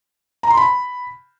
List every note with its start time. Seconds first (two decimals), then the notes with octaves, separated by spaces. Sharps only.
0.43 A#5
0.50 C6
0.57 B5